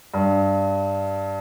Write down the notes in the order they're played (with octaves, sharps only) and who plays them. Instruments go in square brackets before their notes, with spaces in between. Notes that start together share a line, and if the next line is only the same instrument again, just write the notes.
[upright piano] G2